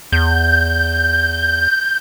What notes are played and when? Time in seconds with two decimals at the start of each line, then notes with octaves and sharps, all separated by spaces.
0.12 E2 G6